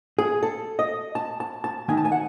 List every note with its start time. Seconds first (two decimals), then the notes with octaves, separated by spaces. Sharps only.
0.19 G#4
0.43 A4
0.79 D#5
1.15 A5
1.40 A5
1.64 A5
1.88 D#3 A3 D#4 G#5
1.97 A5
2.05 G#5
2.12 F#5